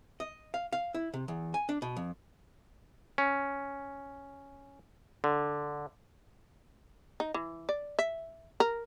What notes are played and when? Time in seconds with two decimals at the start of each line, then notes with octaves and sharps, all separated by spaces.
0.20 D#5
0.54 F5
0.72 F5
0.94 E4
1.14 C3
1.28 E2
1.54 G#5
1.69 D4
1.82 B2
1.97 F2
3.18 C#4
5.24 D3
7.20 D#4
7.34 E3
7.69 D5
7.99 E5
8.60 A#4